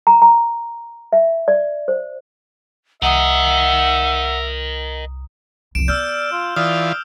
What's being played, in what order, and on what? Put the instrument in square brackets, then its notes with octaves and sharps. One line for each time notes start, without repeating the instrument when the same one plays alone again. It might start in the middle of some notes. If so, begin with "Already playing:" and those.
[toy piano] A#5
A#5
E5
D5
C5
[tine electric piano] C2 A#5 D#6 [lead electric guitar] A#4 D#5 [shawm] E5 [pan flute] F#5
[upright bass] C2 F2 [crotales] D7 E7
[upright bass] B3 [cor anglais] D5 [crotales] E6 F6 G6
[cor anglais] F4
[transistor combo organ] E3 F4 [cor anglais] D5 [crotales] D#6 F6